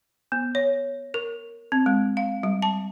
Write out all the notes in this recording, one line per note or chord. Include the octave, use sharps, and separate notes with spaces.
B3
C#5
A#4
C4
G#3
F5
G3
A5